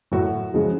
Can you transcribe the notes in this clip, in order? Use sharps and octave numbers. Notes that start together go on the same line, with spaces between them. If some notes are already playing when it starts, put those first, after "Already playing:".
A2 F#3 F#4
C#3 F3 G#3